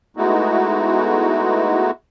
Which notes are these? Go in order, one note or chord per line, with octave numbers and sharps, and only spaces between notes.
G#3 A3 B3 D#4 E4 F#4